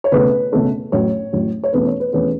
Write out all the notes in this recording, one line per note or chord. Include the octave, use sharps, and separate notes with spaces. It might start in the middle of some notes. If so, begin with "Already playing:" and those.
C#5
C#2 B2 A3 C#4 B4
C#2 B2 A3 C#4
A1 A2 F#3 C#5
A1 A2 F#3
C#5
E2 B2 A3 C#4 B4
C#5
B4
E2 B2 A3 C#4 B4